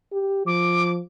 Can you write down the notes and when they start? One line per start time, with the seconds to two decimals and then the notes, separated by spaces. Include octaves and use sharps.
0.12 G4
0.46 F3 D6